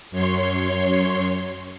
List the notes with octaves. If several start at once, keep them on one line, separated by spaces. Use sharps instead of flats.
F#2 C#5 C6